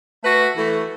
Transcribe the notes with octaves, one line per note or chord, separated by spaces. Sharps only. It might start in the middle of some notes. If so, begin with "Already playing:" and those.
A3 F#4 B4
E3 A3